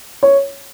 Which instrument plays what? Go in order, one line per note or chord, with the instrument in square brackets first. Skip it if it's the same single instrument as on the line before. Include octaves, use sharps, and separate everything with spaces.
[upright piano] C#5